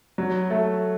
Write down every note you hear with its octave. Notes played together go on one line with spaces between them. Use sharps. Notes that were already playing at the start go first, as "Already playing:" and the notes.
F#3
A3